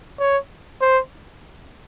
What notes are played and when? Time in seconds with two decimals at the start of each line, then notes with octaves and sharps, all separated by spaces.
0.19 C#5
0.81 C5